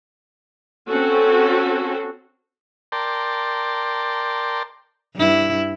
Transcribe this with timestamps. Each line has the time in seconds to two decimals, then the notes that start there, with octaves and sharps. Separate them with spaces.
0.89 C4 C#4 F#4 A4
2.92 A#4 D5 G5 A5 C6
5.15 G2 E4